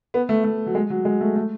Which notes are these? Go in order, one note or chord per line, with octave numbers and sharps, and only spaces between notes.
B3
A3
A3
F#3
G#3
F#3
G#3
A3
A3